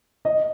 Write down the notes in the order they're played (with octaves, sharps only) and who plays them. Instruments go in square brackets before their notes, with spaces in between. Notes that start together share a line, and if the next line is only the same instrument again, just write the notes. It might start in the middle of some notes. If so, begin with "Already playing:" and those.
[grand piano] D#5